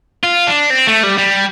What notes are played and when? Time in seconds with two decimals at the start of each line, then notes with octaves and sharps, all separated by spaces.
0.23 F4
0.47 D4
0.70 C4
0.87 A3
1.03 G3
1.18 G3